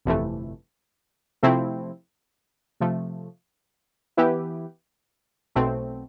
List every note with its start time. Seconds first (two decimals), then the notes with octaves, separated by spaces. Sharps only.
0.05 G1 F2 C3 E3 A3
1.43 C3 F3 A3 C4 E4
2.80 C3 F3 A3
4.17 E3 B3 E4 G4 B4
5.55 B1 B2 A3 C4